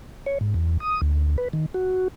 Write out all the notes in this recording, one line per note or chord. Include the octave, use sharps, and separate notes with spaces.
C#5
G#2
E2
D#6
D2
B4
D#3
F#4